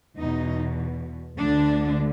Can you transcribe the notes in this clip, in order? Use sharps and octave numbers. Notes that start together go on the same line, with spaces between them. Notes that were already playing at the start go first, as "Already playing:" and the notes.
E2 B2 D#4
D2 D3 D4